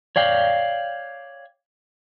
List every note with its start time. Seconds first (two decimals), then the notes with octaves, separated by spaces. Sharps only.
0.16 C#5 D5 F5 G5